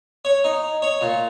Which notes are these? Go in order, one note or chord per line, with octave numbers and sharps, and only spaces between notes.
C#5
D#4
C#5
A#2